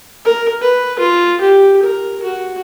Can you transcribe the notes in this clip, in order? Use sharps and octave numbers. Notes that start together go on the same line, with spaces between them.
A#4
B4
F4
G4
A#4
F#4